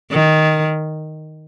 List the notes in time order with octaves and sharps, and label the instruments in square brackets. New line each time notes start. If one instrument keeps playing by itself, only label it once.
[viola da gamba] D#3